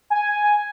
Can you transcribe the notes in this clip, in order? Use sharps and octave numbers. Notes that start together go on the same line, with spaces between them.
G#5